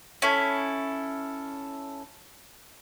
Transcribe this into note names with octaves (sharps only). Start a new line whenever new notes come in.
C#4 E4 A4